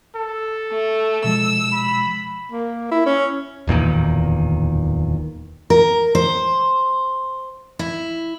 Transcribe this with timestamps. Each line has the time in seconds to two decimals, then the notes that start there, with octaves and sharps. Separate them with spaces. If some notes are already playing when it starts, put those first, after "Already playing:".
0.16 A4
0.71 A3
1.24 B2 F3 G#3 E6
1.72 B5
2.52 A#3
2.92 E4
3.06 C#4
3.67 D1 E2 A#2 D#3
5.70 A#4
6.15 C5
7.79 E4